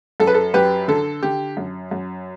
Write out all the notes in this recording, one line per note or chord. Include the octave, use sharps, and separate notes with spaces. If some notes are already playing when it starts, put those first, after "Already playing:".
F#2 A4
B4
A4
F#2 G4 B4
D3 A4
D3 G4
F#2
F#2